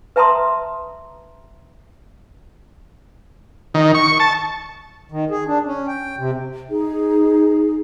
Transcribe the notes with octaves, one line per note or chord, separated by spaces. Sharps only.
B4 E5 A5 A#5 C6 D#6
D#3
C#6
A5
D#3
G#4
D4
C#4
G5
C3
D#4 G#4